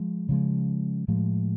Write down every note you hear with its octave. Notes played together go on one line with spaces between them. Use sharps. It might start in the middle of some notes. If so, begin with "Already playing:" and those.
Already playing: F3 G#3
C#3 F3 G#3
A2 F3 G#3